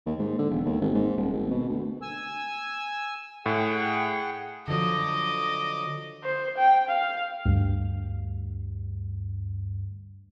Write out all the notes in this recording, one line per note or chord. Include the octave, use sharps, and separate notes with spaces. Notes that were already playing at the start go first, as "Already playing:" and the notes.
D#2
G#2
D3
E1
D#2
G#1
G#2
D#1
G#1
B2
D2
G#5 E6
A2 G#4 F#5 G5
D3 F3 F#3 D#5 D6
C5
G5
F5
D2 G2